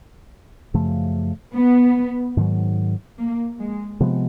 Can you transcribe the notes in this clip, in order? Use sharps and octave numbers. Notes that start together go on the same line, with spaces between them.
F#2 C#3 F3 A3
B3
G#2 D#3 F#3
A#3
G#3
C3 F3 G#3 B3